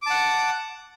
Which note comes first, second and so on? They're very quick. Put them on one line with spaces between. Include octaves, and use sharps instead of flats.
D6 A5 F#5